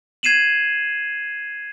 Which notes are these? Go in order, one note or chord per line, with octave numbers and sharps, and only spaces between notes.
G#6 C7 D#7 E7 F#7